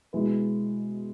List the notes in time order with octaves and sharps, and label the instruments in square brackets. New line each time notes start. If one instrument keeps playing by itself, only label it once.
[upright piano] B2 G#3 E4 B4